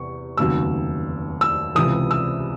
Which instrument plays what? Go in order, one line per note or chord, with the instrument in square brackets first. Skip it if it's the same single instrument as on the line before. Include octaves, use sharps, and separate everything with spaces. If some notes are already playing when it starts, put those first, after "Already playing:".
Already playing: [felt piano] E2 C3 C#6
F1 D#2 C#3 F#3 E6
E6
C#2 C3 E3 D#6
E6